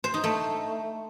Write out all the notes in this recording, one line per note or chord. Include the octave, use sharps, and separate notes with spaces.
C5
D#4
A3